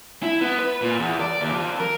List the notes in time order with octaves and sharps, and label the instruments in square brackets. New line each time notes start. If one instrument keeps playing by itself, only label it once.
[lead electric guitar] E4
B3
B4
A#2
E2
D5
D#2
F2
A#4